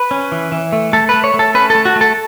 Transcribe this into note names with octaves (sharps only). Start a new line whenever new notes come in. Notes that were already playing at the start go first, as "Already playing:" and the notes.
Already playing: B4
C#4
E3
E3
A3
A3 A4
A3 B4
C#5
A3
A4
C#4 B4
A3 A4
F#4
A3
A4